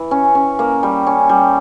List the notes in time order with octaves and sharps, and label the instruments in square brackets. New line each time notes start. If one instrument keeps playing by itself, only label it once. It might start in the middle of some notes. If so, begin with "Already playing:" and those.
Already playing: [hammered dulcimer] E3
C#4
C#4
A#3
G3
C#4
G3